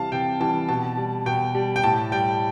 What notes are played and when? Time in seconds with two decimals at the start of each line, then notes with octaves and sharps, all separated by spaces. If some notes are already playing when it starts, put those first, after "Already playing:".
Already playing: C3 E3 G3 F5 A5
0.12 C3 G5
0.40 E3 G3 A5
0.69 B2 A5
0.97 G3
1.26 B2 G5
1.55 G3
1.76 G5
1.84 A2 A5
2.12 G3 G5